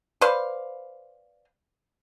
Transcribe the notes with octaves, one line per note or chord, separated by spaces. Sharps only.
B4 C5 D5 F5